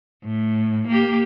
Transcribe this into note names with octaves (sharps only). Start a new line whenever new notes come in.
A2
A#3 G4